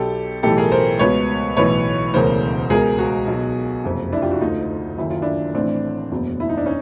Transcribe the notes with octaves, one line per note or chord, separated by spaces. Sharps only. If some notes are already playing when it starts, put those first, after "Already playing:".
Already playing: B1 B2 G4 A4
B1 A2 E3 G4 A4
G#4 A#4
A#4 C5
C#2 B2 B4 C#5
B1 A2 E3 B4 C#5
E1 D2 C#3 E3 A#4 C5
C#2 B2 G#4 A#4
F#4 G#4
B1 B2
F#1 F2 C3
D4 E4
F4 G4
E4 F#4
D2 D3 D#4 F4
F#1 F#2 D#3 E4
F4
D4 E4
A1 A2 E3 C4 D4
F#1 E2 B2
E4
D#4
D4
C#4 D#4